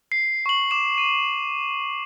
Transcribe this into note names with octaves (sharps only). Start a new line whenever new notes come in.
C7
C#6 F#7
D6 E7
D#7